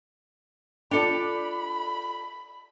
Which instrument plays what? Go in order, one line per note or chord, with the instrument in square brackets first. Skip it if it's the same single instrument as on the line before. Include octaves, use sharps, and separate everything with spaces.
[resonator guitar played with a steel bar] D4 D5 [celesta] F4 C#7 F7 [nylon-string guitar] A4 G5 [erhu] B5